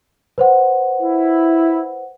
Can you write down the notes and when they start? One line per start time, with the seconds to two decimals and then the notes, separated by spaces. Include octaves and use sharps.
0.38 B4 C5 F#5
1.02 E4